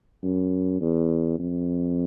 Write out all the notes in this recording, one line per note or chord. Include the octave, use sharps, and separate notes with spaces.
F#2
E2
F2